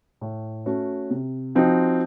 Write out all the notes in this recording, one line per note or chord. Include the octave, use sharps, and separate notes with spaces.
A2
A3 C#4 F#4
C3
F3 C4 D#4 F#4